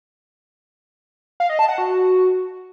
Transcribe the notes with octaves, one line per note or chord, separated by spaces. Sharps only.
F5
D#5
A5
F#5
F#4